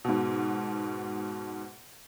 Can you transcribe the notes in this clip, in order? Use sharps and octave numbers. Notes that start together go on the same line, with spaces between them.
G#2 B2